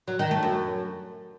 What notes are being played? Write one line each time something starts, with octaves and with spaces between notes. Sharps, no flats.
F#3
D#3
A3
F#2